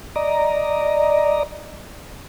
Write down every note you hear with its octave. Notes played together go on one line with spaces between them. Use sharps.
D5 D#5 A#5